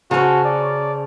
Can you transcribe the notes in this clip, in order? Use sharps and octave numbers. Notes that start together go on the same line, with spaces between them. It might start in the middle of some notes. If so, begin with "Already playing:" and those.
C#3 C#4 F#4 C5 A5 A#5
D5